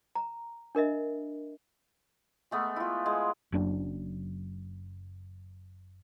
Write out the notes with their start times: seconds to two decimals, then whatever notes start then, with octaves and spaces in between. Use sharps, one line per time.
0.15 A#5
0.75 D4 A#4 D#5 E5
2.51 G#3 A3 B3
2.76 E4 F4
3.06 G#3
3.52 F#1 F#2 D4